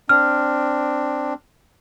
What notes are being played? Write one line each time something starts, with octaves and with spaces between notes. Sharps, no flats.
C4 D4 F6